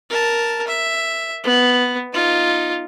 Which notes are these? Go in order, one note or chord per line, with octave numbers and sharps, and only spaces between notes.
A#4 A5
E5
B3
D#4 F4